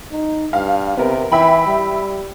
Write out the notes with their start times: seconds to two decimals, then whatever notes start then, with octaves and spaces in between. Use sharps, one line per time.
0.12 D#4
0.53 G2 F5
0.97 C3 B3 A#4
1.32 E3 E5 G5 B5
1.67 G3